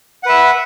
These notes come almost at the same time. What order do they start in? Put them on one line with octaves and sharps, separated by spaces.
F#5 B4 E5